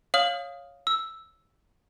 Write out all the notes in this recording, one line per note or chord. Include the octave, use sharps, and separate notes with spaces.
C#5 F5 D#6 F6 F#7
E6